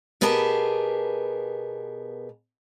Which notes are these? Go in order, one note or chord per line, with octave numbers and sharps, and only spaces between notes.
B2 B3 G4 G#4 A#4 A5